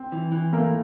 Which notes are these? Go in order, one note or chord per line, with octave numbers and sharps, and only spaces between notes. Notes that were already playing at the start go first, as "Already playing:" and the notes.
Already playing: C4
E3
E3
A3 A#3 A#4